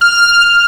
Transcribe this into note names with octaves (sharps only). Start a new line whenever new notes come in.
F6